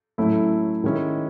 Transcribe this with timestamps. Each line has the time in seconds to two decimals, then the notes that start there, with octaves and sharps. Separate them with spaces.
0.18 A2 F#3 A3 C#4 E4
0.84 D#3 G#3 C#4 E4